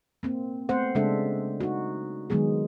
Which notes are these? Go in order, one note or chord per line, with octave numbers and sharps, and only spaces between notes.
A#3 C4
A3 B3 C4 C5 F#5
C#3 G#3 D4 A4 E5
D#4 F#4
D#3 F#3 G#3 B3 G#4